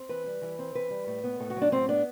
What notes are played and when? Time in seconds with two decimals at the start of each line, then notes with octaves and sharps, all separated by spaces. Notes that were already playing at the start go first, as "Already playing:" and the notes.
Already playing: C4
0.09 E3 B4
0.26 G3
0.42 E3
0.59 C4
0.75 E3 B4
0.90 G3
1.07 A2
1.24 B3
1.40 A2 A4
1.50 F#4
1.56 F#3
1.62 D4
1.72 A2 C4
1.89 B3 D4